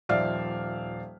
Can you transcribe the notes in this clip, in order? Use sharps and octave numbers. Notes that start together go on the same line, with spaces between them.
D#1 F3 D5 E5 F5 F6